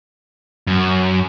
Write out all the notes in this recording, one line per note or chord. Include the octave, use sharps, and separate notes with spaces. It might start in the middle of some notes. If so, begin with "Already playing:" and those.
F#2